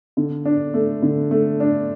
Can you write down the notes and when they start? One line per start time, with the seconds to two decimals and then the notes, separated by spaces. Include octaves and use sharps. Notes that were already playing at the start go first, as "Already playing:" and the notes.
0.17 D3
0.45 D4
0.74 A3
1.02 D3
1.31 A3
1.60 D4